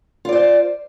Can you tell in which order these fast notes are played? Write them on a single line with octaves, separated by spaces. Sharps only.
F4 D5 C5